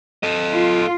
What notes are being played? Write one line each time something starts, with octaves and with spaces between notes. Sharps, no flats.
A4 D#5
F4